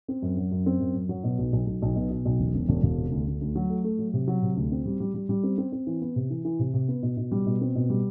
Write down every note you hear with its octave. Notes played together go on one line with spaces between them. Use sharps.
C4
F#2
F#3
F#2
C4
F#2
F#2
F#3
B2
B1
B1
B1
B1
B2
B2
B1
E1
E1
E1
E1
C3
D2
D2
D2
F#3
A3
A3
F#3
C3
F#3
C3
D2
C4
G3
G3
G3
G3
C4
C4
C4
E3
B3
C3
E3
E3
C3
C3
B3
B2
B2
G3
B2
C4
B2
G3